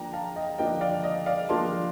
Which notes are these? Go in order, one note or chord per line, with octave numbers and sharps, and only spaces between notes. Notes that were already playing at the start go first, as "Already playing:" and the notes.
Already playing: F3 A#3 D4 G5 A#5
F5 A5
D#5 G5
F3 A#3 D4 D#5 G5
D5 F5
D#5
D5 F5
F3 A#3 D4 A5 C6